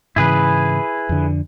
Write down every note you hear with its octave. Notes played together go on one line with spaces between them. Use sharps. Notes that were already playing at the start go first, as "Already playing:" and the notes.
G#2 C#3 E3 E4 G#4 B4
F2 D3